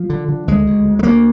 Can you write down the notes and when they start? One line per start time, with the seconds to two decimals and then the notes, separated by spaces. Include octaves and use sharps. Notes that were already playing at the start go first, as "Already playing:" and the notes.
Already playing: F3
0.10 D3
0.28 D3
0.48 D2 G#3
0.66 D2
0.85 D2
0.99 G#3
1.03 D2 A#3